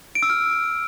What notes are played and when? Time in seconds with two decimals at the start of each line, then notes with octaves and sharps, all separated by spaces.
0.15 D7
0.23 E6
0.30 F6